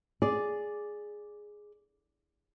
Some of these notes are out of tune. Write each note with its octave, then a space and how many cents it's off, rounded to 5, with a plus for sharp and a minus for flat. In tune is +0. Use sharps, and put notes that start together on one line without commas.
G#4 +0 D5 -5